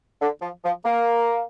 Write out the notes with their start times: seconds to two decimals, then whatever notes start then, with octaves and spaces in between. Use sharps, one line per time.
0.21 D3
0.42 F3
0.64 F3
0.85 A#3